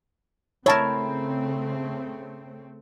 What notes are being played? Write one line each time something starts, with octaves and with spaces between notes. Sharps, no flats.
C#3 A3 C4 E4 A#4 C#5 A5